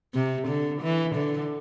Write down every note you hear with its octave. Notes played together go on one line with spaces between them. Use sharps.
C3
D3
E3
D3